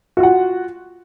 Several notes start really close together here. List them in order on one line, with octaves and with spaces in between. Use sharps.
F#4 F4 F#5